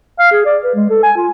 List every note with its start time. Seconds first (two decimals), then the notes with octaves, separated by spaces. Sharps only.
0.19 F5
0.32 G#4
0.46 D5
0.63 B4
0.75 G#3
0.90 A4
1.03 G#5
1.17 F4